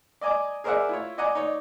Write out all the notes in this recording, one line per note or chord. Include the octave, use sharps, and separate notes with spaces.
D5 D#5 G#5 A#5 D6
G#4 A#4 C5 D5 E5 F#5
E4 F4 C#5
D5 D#5 F#5 G#5 A#5 D6
D#4 C#5 D5